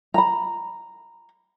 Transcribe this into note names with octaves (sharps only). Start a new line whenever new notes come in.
A#5 B5